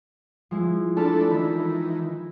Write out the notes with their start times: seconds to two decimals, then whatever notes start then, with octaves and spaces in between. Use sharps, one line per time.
0.51 F3 G#3 E4
0.97 A3 D4 A4 A5 B5 F6
1.30 D#3 E3 B5 E6